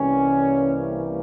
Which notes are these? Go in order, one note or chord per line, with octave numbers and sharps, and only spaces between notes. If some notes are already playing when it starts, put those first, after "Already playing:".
Already playing: C2 C3 E3 G3 A#3 C#4